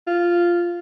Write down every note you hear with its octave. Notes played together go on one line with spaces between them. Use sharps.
F4